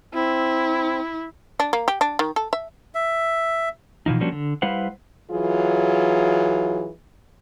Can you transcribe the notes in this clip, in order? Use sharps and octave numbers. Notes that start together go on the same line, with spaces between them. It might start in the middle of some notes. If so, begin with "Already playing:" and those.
C4 E4
D4
A#3
G4
D4
D#3
A4
E5
E5
B2 E3 F3 D#4
F3 G3 A#3 C#4 D4 F#4
D3
G3 E4 B4 C5 F5 F#5
E3 F#3 F4 G#4